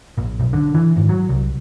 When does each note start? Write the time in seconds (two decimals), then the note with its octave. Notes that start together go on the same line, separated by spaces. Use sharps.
0.18 A#1
0.40 B1
0.53 D3
0.75 E3
0.96 G#1
1.09 F#3
1.29 C2